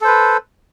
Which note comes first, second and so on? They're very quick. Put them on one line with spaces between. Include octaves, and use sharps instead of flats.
A4 C5 B4